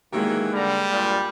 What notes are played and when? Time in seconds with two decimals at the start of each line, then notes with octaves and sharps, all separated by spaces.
0.12 D#3 E3 F#3 G#3 A#3 G4
0.54 D3 G3 A#5
0.91 G2 A#2 F4